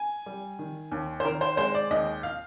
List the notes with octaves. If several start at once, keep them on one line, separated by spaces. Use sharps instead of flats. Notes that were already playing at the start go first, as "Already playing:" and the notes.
Already playing: G#5
G3
D#3
D#2
C5
D#3 A#4
C5
G#3 C5
D5
D#2 D#5
F5